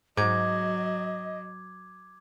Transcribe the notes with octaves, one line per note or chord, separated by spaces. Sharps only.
G#2 F#3 D#5 D6 G#6